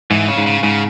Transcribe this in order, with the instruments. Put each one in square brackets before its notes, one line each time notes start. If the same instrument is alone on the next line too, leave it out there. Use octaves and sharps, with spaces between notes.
[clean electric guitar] G#2 [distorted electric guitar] E3
[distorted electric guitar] C#3
[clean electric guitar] G#2
[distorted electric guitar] C#3
[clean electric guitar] G#2 [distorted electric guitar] C#3